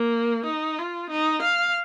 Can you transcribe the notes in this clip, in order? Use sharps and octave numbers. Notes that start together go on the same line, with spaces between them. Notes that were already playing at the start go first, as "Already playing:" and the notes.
Already playing: A#3
D#4
F4
D#4
F5